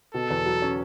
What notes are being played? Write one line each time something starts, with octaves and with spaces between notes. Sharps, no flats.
B2 A4
E2
F#3
C#4